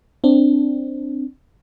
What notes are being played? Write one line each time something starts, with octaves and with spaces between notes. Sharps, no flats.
C4 D4